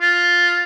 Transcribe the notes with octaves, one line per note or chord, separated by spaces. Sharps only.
F4